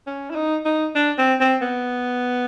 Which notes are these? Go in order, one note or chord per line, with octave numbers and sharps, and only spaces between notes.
C#4
E4
D#4
D#4
D4
C4
C4
B3